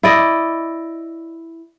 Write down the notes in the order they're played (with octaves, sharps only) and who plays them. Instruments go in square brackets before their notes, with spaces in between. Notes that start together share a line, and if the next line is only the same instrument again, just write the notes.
[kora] E4 D5 D#5